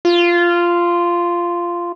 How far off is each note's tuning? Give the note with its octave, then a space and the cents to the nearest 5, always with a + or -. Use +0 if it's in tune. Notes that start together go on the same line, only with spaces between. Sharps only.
F4 -10